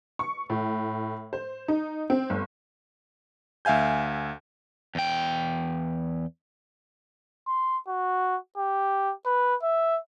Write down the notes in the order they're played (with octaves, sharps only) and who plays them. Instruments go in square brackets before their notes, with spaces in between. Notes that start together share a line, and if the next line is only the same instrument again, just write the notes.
[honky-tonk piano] C#6
A2
C5
D#4
C4
G1
[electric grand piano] D2 E5 F5 G#5 G6
[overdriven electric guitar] E2 G5
[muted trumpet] C6
F#4
G4
B4
E5